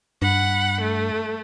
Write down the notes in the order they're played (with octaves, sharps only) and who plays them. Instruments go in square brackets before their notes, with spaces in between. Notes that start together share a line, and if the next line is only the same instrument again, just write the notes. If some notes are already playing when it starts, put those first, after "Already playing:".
[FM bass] G2 [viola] F#5 B5
[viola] A3